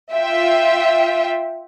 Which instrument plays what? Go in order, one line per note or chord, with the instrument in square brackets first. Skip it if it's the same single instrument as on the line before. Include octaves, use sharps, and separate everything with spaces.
[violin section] F4 E5 G5